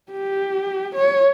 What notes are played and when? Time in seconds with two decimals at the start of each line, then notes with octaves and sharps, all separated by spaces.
0.12 G4
0.96 C#5